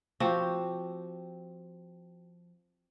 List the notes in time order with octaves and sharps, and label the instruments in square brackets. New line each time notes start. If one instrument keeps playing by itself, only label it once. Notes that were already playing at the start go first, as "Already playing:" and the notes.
[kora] F3 C4 F#4 G4